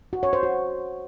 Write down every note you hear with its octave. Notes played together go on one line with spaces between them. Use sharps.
F#4
C#5
C5
F#4